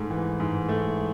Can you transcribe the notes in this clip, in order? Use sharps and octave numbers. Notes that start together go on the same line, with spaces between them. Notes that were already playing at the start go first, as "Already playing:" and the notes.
Already playing: G#2 A3
E3
G#2
A3